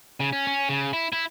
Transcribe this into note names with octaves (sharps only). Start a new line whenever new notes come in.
C#3
C#4
C#4
C#3
E4
E4